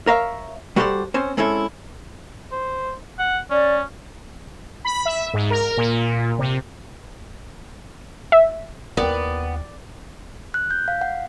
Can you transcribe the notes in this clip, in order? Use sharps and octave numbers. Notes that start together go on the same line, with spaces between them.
A#4 C#5 E5 F5
G3 F#4 G4 A4 C5 D5
C4 C#4 C5
G#3 C4 C#4 E4 A4
C5
F#5
C#4 D5
B5
E5
G#2
A#4
A#2
C3
E5
D#2 B3 E4 A#4 D5 G5
F#6
G6
F5
F#5